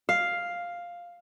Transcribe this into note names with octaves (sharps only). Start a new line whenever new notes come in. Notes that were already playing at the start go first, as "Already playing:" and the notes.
F5